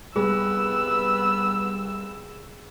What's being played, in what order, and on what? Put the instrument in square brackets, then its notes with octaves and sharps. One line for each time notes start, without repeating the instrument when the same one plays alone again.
[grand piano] C2 [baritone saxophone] B3 [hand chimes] G#4 [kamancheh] E6